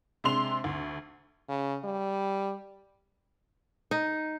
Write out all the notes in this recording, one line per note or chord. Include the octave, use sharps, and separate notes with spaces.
C3 G#3 D4 C6 F7
D2
C#3
G3
D#4